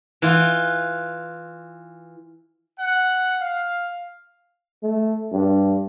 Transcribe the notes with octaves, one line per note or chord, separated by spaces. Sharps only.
E3 F4
F#5
F5
A3
G2